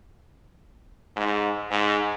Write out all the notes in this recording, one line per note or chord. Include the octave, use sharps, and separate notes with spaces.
G#2
G#2